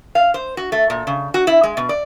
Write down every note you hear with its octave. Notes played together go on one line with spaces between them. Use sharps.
F5
C5
F#4
A3
A#2
C#3
F#4
E4
G#3
B2
D5